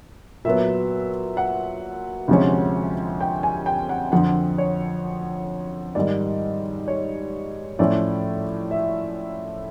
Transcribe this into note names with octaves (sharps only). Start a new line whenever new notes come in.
A#2 F#3 B3 E5
F#5
D2 C3 F3 G#3 C#4
G5
G#5
G5
F#5
F2 D3 F3 F#5
C#5
G#2 D#3 G3 D5
C#5
A2 F3 A3 C#4 D5
E5